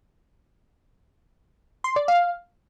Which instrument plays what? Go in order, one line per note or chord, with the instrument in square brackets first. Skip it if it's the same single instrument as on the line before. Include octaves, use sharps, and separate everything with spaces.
[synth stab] C6
D5
F5